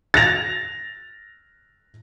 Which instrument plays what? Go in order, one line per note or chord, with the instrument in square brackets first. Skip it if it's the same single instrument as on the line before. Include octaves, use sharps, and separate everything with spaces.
[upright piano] A6 A#6 F7